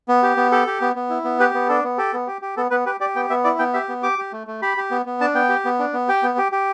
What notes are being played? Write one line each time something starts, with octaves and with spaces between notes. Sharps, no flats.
B3
G4
B3
G4 A4
G4
B3
B3
E4
B3
G4 B4
B3
D4 A4
B3
G4 A4
B3
G4
G4
B3 A4
B3 B4
G4 B4
G4 D5
B3 G5
B3 E5
E4 D5
B3 G5
G4 E5
B3
G4 D6
G4
A3
A3
G4 B5
G4
B3
B3
D4 A5
B3 G5
G4
B3
D4
B3
G4 G5
B3
G4
G4